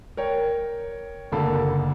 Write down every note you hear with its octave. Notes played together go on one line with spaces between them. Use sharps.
A#4 C#5 G5
F#1 D2 A#3 A4 B5